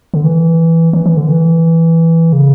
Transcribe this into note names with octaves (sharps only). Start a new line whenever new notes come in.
D3
E3
E3
E3
D3
E3
C#3